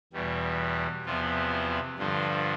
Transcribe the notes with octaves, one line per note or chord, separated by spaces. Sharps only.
E2 B2 G3
E2 C3 F3 B3 F4
F4
G2 D3 F3 F4